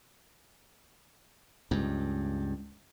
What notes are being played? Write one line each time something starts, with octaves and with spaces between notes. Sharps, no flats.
C#2 G2